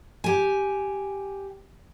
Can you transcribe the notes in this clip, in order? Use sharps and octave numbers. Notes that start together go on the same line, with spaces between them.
G4 G#5